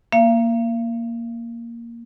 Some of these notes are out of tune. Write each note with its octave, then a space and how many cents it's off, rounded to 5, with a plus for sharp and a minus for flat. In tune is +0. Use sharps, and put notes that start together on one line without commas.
A#3 +0 F5 -45